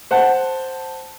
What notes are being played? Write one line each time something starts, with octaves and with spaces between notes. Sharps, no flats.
C5 F#5 A5